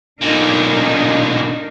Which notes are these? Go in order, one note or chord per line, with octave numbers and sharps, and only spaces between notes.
B1 A#2 D4 D#4 A#4